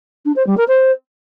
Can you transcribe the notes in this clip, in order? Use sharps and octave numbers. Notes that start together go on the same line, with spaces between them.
D4
C5
G3
A#4
C5